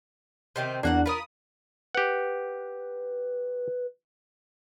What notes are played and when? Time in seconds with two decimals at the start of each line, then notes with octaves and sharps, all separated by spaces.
0.56 C3 D#3 C4 G6
0.83 E2 A#3 D4 F#4 F#5
1.06 F4 A#4 B5 D#6
1.95 G4 B4 F#5